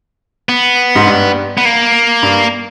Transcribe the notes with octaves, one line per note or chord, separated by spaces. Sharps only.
B3
G#2
G2
B3
A#3
G2